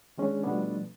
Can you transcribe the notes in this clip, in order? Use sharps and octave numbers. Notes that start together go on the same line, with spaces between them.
D#3 G#3 C#4 D4 G#4
B2 F3 G3 A3 B3 D4